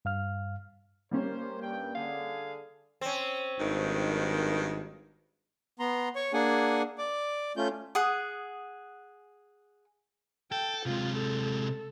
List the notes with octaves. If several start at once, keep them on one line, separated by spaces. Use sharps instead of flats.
G2 F5 F6
G3 A#3 C#4 A#4 C5
G2 G5
D3 G#4 F5
C4 C#4
G#1 G2 D#3
B3 A#5 C6
C#5 C#6
A#3 D4 G#4 F#5 G#5
D5 D6
A3 C#4 F4 G6
G#4 F#5 D#6
A4 G5
C3 G#3 F4
A4